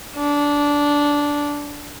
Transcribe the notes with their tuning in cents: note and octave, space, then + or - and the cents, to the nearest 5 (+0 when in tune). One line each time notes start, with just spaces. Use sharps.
D4 -15